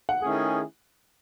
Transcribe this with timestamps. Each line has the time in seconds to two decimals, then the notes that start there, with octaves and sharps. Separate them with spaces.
0.09 F#5
0.22 D#3 A3 C#4 E4 G#4